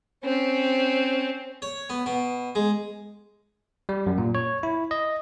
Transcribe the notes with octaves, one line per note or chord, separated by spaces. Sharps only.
C4 C#4
C#5
B3
B2
G#3
G3
F#2
A#2
C#5
E4
D#5